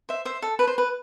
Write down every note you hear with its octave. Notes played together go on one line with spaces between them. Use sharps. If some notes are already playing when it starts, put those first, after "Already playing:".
C5 E5
C5 E5
A4
B4
C5
B4